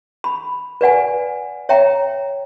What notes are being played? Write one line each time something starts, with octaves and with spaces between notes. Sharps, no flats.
B5
B4 D5 F#5 G#5
C#5 E5 G5 A#5